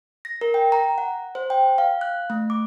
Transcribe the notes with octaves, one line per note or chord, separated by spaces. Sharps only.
A#6
A#4
G5
A#5
F#5
C5
G5
F5
F#6
A3
D6